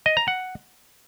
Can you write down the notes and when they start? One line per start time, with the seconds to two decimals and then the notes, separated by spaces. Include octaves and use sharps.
0.06 D#5
0.17 A#5
0.28 F#5